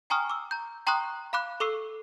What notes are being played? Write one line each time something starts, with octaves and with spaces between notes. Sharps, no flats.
G5 G#5 A#5 C#6 D#6 F6
D6 E6
A#5 G6
G5 A#5 C6 C#6 D#6 F#6
F5 B5 D6 F#6
A4 C#6 D6 E6 C7 D#7